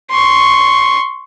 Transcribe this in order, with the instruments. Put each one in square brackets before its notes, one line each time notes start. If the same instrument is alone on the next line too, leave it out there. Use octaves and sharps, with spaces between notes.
[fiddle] C6 C#6